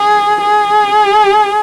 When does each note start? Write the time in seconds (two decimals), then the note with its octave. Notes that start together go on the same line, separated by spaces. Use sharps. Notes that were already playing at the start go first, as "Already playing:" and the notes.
Already playing: G#4
0.41 G#4